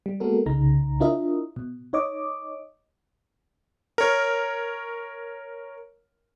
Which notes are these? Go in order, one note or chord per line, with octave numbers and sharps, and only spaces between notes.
G3
G#3 A#3 B3 F#4 A4 A#4
C2 C#3 D#4 A#5
D4 E4 F4 A#4 D#5 E5
B2
D#4 C#5 D#5 D6
A#4 C#5